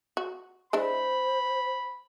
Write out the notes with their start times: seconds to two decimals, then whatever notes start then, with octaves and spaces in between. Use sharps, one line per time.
0.17 F#4
0.73 G#3 D4 E4 C5 B5